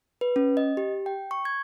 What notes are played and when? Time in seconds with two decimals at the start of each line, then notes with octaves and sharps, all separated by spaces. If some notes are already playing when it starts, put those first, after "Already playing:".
0.21 B4
0.36 C#4
0.57 D#5
0.77 G4
1.06 G5
1.31 C#6
1.45 G#6